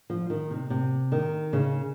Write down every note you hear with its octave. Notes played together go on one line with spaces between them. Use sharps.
F3
D#3
C3
C3
D#3
C#3